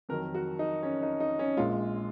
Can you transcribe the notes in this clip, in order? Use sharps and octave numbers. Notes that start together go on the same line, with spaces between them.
F2 D#3 F#3 A#4
F#4
D#4
C#4
D#4
D#4
C#4
A#1 A#2 G#3 F4